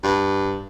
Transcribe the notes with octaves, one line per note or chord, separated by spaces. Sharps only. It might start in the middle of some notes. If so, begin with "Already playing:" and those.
G2